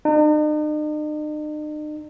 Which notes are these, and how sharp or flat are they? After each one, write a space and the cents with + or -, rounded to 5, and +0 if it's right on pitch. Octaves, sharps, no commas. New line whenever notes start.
D#4 -45